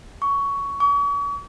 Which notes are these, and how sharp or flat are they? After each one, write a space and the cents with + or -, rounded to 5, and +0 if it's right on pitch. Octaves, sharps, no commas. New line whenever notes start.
C#6 +15
C#6 +45